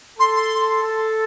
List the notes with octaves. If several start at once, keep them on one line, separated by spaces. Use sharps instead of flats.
A4 C6
C6
A4